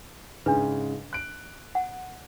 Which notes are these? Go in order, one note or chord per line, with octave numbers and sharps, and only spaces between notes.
G#2 C#3 D4 B4
F#6 D7
F#5